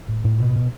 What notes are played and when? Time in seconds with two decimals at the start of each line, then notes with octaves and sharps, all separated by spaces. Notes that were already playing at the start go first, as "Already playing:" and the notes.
0.09 A2
0.24 A2
0.40 B2
0.55 B2